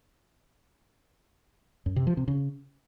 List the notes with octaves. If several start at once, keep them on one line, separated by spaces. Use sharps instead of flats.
F#2
C3
F3
C3
C#3